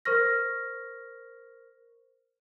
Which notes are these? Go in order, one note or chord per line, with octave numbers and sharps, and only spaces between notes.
A#4 C5 C#6 F6 A#6